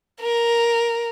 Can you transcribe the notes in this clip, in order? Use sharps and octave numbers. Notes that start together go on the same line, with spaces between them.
A#4